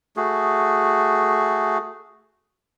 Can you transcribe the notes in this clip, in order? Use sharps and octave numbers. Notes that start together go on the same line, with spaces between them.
A3 F#4 G#4